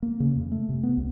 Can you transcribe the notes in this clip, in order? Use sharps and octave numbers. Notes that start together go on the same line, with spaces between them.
A#3
C#3
F2
A3
C3
B3
C#2